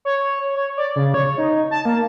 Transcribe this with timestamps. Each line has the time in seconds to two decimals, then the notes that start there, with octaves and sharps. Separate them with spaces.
0.05 C#5
0.55 C#5
0.77 D5
0.96 C#3
1.14 C#5
1.38 D#4
1.71 A5
1.85 A#3